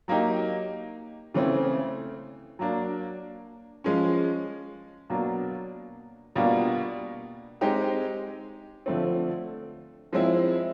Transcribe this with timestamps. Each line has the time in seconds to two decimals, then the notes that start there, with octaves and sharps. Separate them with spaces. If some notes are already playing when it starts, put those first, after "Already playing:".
0.08 F#3 A#3 D#4 G4
1.34 C#3 E3 A3 C4
2.59 F#3 A#3 D4
3.84 F3 G#3 C#4
5.10 B2 F#3 A#3 D4
6.35 B2 G3 A#3 D4 F4
7.61 G#3 C4 D#4 G4
8.86 D3 F3 A3 C4
10.13 F3 G#3 C4 E4